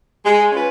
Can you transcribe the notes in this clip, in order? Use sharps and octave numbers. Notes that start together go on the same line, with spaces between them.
G#3
C#4 F4 B4